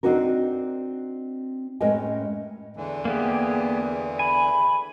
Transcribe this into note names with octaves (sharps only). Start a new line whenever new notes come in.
C4 D4 D#4 F#4 A#4
A2 G#3 C#4 A#4 D#5 G5
E2 D3 E3
A#3 B3 G4 G#4
G#5 B5